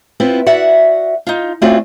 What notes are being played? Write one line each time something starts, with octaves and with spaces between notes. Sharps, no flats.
B3 C4 E4 F4
F#4 D5 E5 F#5
D#4 F4
A3 C4 C#4 F4 F#4 D5